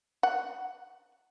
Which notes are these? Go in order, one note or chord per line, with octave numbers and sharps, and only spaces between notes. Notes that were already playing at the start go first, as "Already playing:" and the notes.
F#5